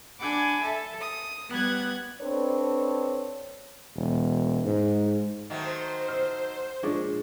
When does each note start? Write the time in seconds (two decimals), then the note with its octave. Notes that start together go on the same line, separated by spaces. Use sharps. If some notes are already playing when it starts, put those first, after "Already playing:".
0.21 D4 F#5 G#5 B5 D6
0.63 A4 E5
1.01 D#6
1.50 G3 B3 F#5 F#6 G#6
2.22 C4 D4 A4 B4 C#5
3.96 E1
4.64 G#2
5.50 D#3 F#3 A3 C5
6.08 E6 F6
6.83 A#2 G#3 C#4 D4 G#4 C#5